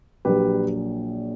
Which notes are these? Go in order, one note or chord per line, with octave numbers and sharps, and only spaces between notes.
A#1 A#2 F#3 G4 B4